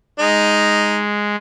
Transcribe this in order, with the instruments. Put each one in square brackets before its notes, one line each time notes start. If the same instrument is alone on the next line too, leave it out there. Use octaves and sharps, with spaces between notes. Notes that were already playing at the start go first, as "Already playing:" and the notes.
[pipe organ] G#3 [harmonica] D#4